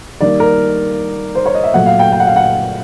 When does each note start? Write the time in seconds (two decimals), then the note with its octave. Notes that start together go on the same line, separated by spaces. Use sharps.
0.21 D#3 G3 A#3 D5
0.40 A#4
1.35 C5
1.46 C#5
1.55 D#5
1.64 E5
1.74 A#2 F#3 A3 F#5
1.86 F5
1.99 G5
2.12 G5
2.20 F#5
2.27 F5
2.36 F#5